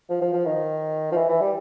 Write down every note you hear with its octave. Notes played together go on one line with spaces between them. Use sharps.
F3
F3
F3
D#3
F3
E3
E3
G3